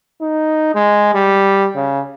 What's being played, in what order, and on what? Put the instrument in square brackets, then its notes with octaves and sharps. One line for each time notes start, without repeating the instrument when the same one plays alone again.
[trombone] D#4
G#3
G3
C#3